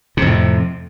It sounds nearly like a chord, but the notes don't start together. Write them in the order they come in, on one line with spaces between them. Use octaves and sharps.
C3 F2 A2